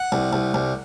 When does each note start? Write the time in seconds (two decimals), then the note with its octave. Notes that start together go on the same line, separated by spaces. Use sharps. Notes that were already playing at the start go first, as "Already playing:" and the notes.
Already playing: F#5
0.12 C2
0.33 C2
0.54 C2